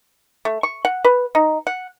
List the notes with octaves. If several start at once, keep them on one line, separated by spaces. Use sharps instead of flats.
A3
C#6
F#5
B4
D#4
F#5